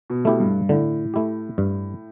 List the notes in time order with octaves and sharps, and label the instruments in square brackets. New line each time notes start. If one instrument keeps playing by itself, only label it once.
[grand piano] B2
[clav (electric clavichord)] A3 E4 G4
[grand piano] G2
[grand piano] A2 [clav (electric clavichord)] D3
[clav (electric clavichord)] A3 E4 G4
G2